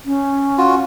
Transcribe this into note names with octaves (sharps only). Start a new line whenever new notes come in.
C#4
F4 F#4